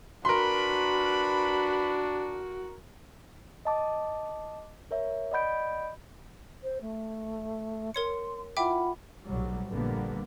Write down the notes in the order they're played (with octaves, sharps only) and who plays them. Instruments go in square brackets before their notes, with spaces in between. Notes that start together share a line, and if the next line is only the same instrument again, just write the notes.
[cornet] D4 [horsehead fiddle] F#4 [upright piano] A#4 C6 [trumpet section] B4 B5
[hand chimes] D#5 A5 D6
A#4 C#5 E5
D5 D#5 F#5 B5 G6 D7
[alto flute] C5
A3
[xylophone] A#4 C#5 C#7 [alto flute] C6
[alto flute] E4 [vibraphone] F4 F#5 B5 [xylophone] E5 G5 D6
[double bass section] B1 A2 C3 F#3 G3
A#1 G2 D3 G3 A#3 B3